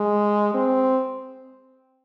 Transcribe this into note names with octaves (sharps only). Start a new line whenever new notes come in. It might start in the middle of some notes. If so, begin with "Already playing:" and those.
Already playing: G#3
C4